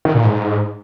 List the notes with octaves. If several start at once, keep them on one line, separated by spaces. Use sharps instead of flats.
D#3
A#2
G#2